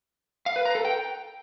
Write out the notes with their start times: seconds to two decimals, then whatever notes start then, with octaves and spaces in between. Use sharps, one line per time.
0.46 F5
0.56 B4
0.65 A#5
0.75 A4
0.85 G5